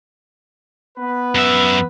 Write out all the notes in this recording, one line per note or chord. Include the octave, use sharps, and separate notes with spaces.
B3 B4
F#2 E5